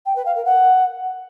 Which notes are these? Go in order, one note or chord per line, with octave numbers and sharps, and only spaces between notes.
G5
B4
F5
A#4
F#5